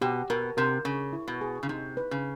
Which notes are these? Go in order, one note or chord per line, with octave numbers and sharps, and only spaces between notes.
B2 G4
B2 A#4
C3 A#4
C#3 G#4
E4
B2
G#4
C#3
C3 D#4
B4
C#3